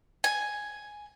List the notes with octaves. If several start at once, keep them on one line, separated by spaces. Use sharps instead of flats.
G#5